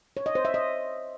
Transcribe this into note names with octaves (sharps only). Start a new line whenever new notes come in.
C#5
D#5
C5
E5
D#5